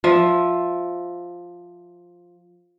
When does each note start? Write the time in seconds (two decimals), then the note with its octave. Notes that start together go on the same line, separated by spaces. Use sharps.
0.04 F3 E5